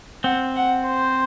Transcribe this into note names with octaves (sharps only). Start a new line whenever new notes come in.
C4 F#5
F#5
C5